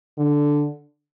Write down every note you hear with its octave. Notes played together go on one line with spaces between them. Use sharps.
D3